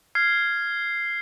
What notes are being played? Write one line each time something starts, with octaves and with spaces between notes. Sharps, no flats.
F6 G#6 C7